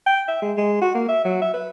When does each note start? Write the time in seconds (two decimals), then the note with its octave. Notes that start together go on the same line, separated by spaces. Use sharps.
0.06 G5
0.28 E5
0.42 G#3
0.57 G#3
0.82 F#4
0.95 A#3
1.09 E5
1.25 F#3
1.42 E5
1.54 B4